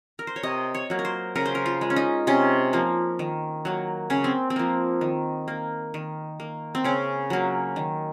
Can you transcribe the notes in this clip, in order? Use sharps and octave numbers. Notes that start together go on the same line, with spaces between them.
A#4
C5
C#5
C3 D#5
C#5
F#3 A#3
A#4
C5
C#3 A#4
C5
A#4
F4
G#3
C#4
D#4
C3 C#4
F3 A#3
D#3
F#3 A#3
C#3 C#4
C4
C4
F3 A#3
D#3
A#3
D#3
A#3
C4
C#3 C#4
F#3 A#3
D#3